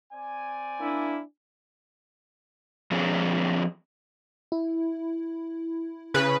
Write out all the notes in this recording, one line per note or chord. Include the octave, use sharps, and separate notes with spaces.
C4 D5 G#5
A#3 D4 E4
F3 C4 D4 G#4 C#5
E4
C#3 B4